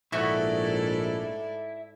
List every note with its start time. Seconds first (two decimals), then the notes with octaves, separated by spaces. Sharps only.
0.12 A#1 G#2 A3 E4 F#4 A4 D5 C#6